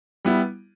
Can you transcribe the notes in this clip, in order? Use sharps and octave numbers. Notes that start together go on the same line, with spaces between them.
G3 B3 E4